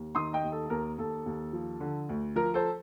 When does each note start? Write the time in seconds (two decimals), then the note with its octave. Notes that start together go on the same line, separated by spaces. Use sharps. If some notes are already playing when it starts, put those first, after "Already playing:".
Already playing: D#2
0.15 D#3 C6 D#6
0.33 D#5 G5
0.43 D#2
0.52 A4
0.66 A4
0.70 D#2 A#4
0.98 D#2 A4
1.26 D#2
1.53 F3
1.80 D3
2.09 D2
2.36 F3 A#4
2.54 A4 C5